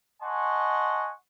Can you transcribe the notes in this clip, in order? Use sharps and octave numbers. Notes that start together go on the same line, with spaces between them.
D#5 F#5 G#5 A5 C6 C#6